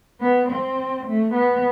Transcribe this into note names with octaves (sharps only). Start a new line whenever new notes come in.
B3
C4
A3
B3